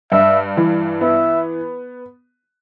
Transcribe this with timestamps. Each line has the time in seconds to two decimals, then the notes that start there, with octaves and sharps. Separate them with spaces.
0.12 G2 E5
0.57 E3
1.01 B3 E5